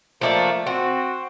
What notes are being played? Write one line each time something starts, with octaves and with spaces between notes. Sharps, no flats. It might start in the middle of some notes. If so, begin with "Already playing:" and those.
F3 A3 A#3 D4
C4 F#4